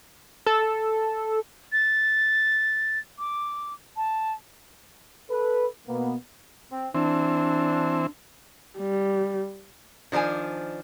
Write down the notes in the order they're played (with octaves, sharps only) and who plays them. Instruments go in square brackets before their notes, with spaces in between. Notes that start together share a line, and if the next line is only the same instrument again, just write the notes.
[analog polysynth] A4
[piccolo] A6
D6
A5
[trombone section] A4 B4
B2 A#3 B3
[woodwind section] C4
[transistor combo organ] E3 C4 [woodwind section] D4
[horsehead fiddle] G3
[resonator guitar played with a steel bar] D#3 F3 D4 C5 G#5